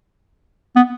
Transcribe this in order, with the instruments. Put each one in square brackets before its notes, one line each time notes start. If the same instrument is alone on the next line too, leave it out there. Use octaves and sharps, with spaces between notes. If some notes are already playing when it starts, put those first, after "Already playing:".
[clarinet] B3